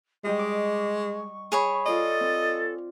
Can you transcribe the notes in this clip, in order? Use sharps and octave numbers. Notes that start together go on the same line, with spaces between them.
G3 G#3 G4 D#5 C#6
D6
G#4 C#5 B5
F4 A4 D5 D#5
C4